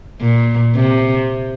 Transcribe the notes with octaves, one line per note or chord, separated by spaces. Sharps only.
A#2
C3